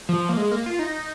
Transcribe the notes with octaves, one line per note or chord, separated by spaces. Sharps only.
F3
A#3
G#3
A#3
F4
D#4